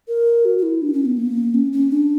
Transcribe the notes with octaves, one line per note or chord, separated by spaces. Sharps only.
A#4
F#4
F#4
E4
D4
C#4
B3
A#3
C#4
C#4
D4